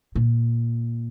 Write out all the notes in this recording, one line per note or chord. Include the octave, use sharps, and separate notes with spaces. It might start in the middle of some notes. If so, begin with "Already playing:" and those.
A#2